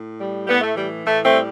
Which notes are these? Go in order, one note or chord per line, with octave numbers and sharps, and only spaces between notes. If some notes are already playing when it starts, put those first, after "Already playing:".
Already playing: A2
G3
A2 G3 B3
A3
E3 G3
A2 A3
A3 C4
G3